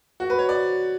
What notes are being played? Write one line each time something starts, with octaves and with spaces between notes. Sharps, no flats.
F#4
B4
C#5
D5